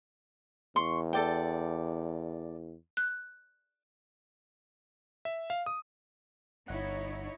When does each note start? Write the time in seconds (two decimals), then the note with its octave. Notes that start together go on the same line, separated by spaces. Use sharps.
0.76 E2 C6 C#6
1.13 A4 D5 G5
2.97 F#6
5.25 E5
5.50 F5
5.66 D#6
6.68 G1 D#4 E4 C#5 F#5